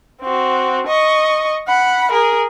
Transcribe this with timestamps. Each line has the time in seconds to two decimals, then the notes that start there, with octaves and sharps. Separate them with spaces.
0.21 C4 F#4
0.87 D#5 C#6
1.67 F#5 B5
2.12 G#4 A#4